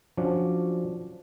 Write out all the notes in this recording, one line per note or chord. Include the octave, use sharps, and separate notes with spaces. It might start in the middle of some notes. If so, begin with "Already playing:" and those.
F3 F#3 C#4 D4